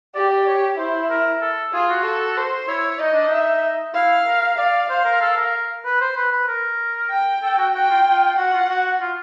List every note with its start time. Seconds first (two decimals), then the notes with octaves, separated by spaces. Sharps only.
0.15 G4 D5
0.31 D5
0.47 C#5
0.78 E4 C5
1.10 A#4
1.41 A4
1.73 F4 G#4
1.89 F#4
2.05 A4
2.37 C5
2.68 E4 C#5
3.00 D#4 D#5
3.13 D4
3.28 D#4 E5
3.94 E4 F5
4.26 A#4
4.58 D5 F5
4.89 C5 F5
5.05 A#4
5.21 A4
5.37 A#4
5.85 B4
6.01 C5
6.16 B4
6.32 B4
6.48 A#4
7.10 G5
7.43 A4
7.58 F#4
7.74 F#4 G5
7.90 F4
8.06 F4
8.37 F#4 F#5
8.53 F4
8.69 F#4
9.01 F4